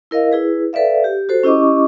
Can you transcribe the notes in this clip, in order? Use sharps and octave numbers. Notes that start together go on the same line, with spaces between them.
E4 A#4 D#5 F5
E4 G#4 B4
A4 B4 D5 E5 F5
G4
F#4 A4 C5
C#4 E4 G4 D#5 C#6 D6